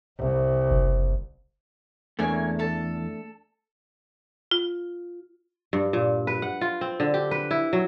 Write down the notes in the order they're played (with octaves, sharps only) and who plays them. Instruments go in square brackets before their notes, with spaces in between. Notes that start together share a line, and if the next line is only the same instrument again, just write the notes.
[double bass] C2
[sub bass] F#1
[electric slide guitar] E2 [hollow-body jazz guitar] A3 D4 [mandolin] A#3 C#5 G#5
[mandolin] A4 A5
[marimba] F4
[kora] G2
A#2
B4
F#5
F4
C4
D3
G4
B4
E4
F#3